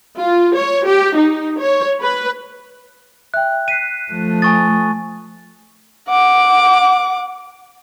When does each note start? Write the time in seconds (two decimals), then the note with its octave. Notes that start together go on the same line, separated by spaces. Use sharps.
0.17 F4
0.54 C#5
0.85 G4
1.16 D#4
1.59 C#5
2.01 B4
3.34 E5 G5 F#6
3.68 F#6 B6 C7 D#7
4.12 F3 A3
4.42 G#5 C#6 D#6 A6
6.08 F#5 D6